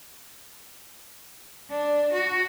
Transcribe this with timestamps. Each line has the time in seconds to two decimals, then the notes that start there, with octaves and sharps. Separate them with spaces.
1.71 D4
2.13 F#4